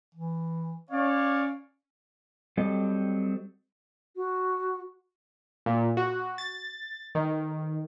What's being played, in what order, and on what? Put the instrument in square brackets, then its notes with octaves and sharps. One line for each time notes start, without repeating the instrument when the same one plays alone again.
[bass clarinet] E3
[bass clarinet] C#4 [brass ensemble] C#5 D5 F5
[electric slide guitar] F#3 G3 C4 A4 D#5
[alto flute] F#4
[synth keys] A#2
F#4
A6
D#3